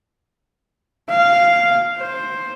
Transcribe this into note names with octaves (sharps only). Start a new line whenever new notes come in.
F5
C5